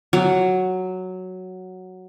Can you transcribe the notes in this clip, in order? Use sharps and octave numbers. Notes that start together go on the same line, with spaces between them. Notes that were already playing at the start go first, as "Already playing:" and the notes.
F#3